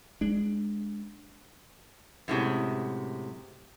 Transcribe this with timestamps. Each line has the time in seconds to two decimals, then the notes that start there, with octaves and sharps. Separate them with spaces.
0.21 G#3 D4
2.28 F#2 A2 C3 G#3